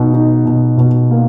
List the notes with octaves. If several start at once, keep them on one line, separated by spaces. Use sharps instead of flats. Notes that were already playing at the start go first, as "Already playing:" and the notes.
Already playing: B2 D#4
D#4
B2
B2
A#3